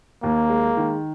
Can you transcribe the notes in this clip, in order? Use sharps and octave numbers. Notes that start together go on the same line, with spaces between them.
D#2 A#3
G#3
D#3